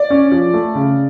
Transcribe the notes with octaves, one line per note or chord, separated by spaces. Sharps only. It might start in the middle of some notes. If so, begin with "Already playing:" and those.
Already playing: D5
C#4
F3
A3
C#3